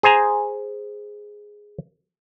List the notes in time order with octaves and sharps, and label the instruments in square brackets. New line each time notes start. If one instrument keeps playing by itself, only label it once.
[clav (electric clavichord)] G#4 C5 G#5 A#5